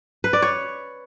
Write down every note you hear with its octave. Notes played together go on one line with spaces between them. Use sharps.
B4
D5
C#5